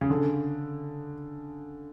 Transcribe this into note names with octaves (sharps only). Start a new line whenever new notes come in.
C#3
D3